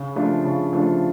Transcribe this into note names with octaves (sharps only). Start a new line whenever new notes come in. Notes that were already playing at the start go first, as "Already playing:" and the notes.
Already playing: C#3
F3 A3 D4 F4
C#3
F3 A3 D4 F4